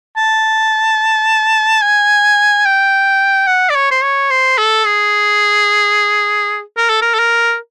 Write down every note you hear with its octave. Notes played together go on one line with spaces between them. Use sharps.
A5
G#5
G5
F#5
D5
C#5
C5
C#5
C5
A4
G#4
A#4
A4
A#4
A4
A#4